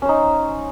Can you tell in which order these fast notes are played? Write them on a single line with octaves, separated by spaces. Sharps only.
C#4 C5 D#4